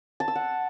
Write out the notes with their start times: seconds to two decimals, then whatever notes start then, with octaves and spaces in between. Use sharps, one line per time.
0.20 A5
0.28 E6
0.35 F#5